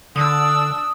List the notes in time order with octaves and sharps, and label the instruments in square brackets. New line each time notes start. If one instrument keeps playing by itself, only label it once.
[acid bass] D3 [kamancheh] D4 E6 [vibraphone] D#6